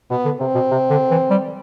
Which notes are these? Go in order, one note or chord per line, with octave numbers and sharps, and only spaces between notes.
B2 B3
D3
C3 C4
B2
C3
D3
E3
G3